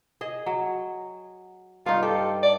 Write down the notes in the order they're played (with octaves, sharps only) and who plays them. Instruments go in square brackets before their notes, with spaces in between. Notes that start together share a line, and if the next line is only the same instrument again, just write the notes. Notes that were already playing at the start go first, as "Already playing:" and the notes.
[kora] G#4 D#5
F#3
[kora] G2 D#4 [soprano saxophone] F4
[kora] G4 [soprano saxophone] A4
[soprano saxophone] D5